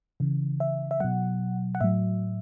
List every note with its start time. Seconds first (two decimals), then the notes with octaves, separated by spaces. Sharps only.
0.20 C#3 E3
0.60 E5
0.91 E5
1.00 B2 F#3 F#5
1.75 F#5
1.81 A2 F#3 E5